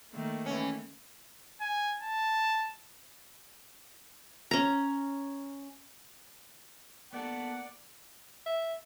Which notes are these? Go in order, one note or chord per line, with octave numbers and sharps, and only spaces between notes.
D#3 A3 A#3
E3 C#4
G#5
A5
C#4 A#5
A#3 B3 A4 D5 F#5
E5